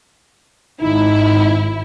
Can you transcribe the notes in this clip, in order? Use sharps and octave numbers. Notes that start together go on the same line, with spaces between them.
G#1 D#4 E4